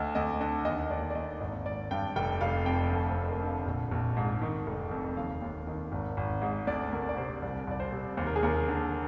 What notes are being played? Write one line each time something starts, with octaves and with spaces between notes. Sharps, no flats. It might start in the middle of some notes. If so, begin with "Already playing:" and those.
Already playing: D2 D#5
D2 D#5
D3 D#5
D#2 D#5
D#5
D#2 D5
D5
D#3 D#5
G#1 D#5
G#1 D5
G2 G5
F1 G5
F1 F5
F2 G5
D2 F5
C5
D2
C5
A#4
D3
F5
A#1
A#1
G#2
D#3
F1
F2
D#2 F5
D#2
D#3
G#1
G#1
G#2
D2 D5
D2 A#4
D5
C3 C5
C2 D5
C2 D5
C5
C3
D#2 C5
A#4
G#4
D#2 A#4
D3